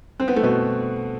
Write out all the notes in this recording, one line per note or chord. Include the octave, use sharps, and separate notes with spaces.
C4
B3
A3
B2 B3